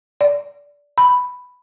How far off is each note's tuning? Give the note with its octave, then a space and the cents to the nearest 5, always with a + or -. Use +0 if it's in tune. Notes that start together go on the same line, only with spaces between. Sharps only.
D5 -15
B5 +5